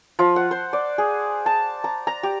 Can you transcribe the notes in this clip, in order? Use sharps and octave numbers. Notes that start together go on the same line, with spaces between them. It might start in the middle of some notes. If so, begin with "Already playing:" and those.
F3
F#5
C5
D5
G#4
A5
A#5
A#5
G4